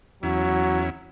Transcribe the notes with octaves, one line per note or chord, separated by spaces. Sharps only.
E2 F#3 C#4 E4